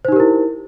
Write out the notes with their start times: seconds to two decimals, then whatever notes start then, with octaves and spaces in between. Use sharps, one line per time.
0.05 C5
0.08 D#4
0.12 G4
0.16 A#4
0.20 E4